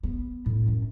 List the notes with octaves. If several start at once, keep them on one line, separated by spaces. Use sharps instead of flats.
B3
A2
F#2